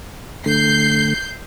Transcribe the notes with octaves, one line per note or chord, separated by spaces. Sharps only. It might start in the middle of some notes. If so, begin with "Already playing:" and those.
D3 A3 G6 C7